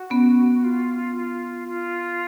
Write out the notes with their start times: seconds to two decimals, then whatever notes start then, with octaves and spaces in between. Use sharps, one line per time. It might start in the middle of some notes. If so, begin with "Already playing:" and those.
Already playing: F#4
0.10 B3 C#4
0.64 F4
1.16 F4
1.68 F4